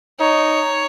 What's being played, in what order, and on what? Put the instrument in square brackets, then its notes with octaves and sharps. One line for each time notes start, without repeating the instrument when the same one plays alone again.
[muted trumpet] D#4 [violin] C#5